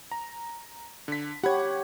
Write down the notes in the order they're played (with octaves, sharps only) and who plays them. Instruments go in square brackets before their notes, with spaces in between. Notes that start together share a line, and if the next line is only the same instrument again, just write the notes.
[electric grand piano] A#5
D3 B6
[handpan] G4 C#5 [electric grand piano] F#5 B5 G#6